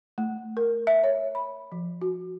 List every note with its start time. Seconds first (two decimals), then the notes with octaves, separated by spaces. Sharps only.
0.18 A3
0.57 A#4
0.87 E5
1.04 C#5
1.35 B5
1.72 F3
2.02 F#4